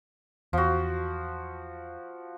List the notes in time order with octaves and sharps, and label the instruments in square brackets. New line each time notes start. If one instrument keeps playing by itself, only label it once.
[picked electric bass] E2 [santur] F3 F#4